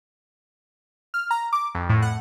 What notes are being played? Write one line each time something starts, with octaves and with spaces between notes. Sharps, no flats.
F6
A#5
D6
F2
A2
F#5